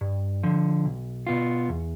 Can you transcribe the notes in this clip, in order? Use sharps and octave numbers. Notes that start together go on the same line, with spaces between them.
G2
D3 F3
B1
B2 B3 F4
E2